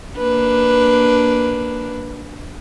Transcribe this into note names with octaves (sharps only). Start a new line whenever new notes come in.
A#3 D4 B4